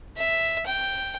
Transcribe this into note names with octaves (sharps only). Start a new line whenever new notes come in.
E5
G5